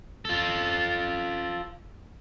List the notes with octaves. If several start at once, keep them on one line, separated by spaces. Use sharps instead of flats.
F4 A4